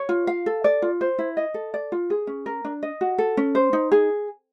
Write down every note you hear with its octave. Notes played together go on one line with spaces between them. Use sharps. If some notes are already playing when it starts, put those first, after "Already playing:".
Already playing: C#5
F4
F5
A4
D5
F4
C5
E4
D#5
A4
D5
F4
G#4
C#4
A#4
D4
D#5
F#4
A4
C#4
C5
D#4
G#4